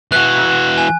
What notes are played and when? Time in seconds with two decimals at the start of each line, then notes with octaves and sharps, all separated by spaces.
0.12 E3 F#4 F#6
0.78 G#5